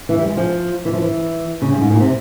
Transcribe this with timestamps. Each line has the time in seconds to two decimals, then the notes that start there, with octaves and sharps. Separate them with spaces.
0.09 E3
0.18 G3
0.28 G#3
0.37 F3
0.85 E3
0.93 F3
1.02 E3
1.62 C#3
1.71 G2
1.81 G#2
1.90 A#2
2.00 C3